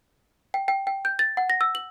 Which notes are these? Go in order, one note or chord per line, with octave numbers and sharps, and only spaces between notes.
G5
G5
G5
G6
A6
F#5
A#6
E6
F#7